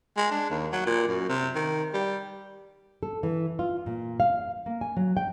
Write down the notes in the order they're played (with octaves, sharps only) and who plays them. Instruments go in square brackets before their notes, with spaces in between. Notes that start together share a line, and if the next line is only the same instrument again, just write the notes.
[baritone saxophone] G#3
D4
D#2
F#3
A#2
F#2
C3
D#3
G3
[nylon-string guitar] A4
E3
F4
A#2
F5
A#3
G#5
F#3
G5